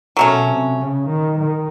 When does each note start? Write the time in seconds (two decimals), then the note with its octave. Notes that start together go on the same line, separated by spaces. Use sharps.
0.16 B2 F#3 A3 C#4
0.47 C3
0.77 C#3
1.08 D#3
1.38 D#3